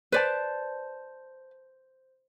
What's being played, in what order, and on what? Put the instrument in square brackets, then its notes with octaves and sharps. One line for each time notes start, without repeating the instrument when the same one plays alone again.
[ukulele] B4 D5 [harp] C5 A5